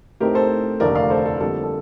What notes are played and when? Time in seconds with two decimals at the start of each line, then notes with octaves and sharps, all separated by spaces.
0.20 A2 A3 C4 D#4 G4 A#4
0.35 A4 C5
0.80 F1 D#2 D3 A3 A#4 D5
0.95 D5 F5
1.10 A4 C5
1.26 A4
1.40 F2 D3 G3 A#3 A4
1.63 A4